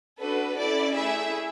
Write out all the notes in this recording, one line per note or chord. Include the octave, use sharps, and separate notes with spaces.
D4 F#4 A4 B4
C#4 E4 A4 D5
A3 E4 G#4 E5